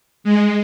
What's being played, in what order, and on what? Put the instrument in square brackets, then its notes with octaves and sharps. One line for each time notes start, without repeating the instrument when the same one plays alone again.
[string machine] G#3